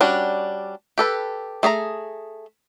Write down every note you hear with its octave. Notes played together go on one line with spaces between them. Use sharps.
G3 C#4 D4 F#4
G4 A4 B4
A3 G#4 D5 A#5